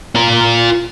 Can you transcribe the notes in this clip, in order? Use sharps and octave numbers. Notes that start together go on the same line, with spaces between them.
F4 A#4